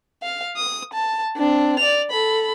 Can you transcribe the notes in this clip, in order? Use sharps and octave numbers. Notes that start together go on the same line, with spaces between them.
F5
D#6
A5
C4 D4
D5 F7
A4 B5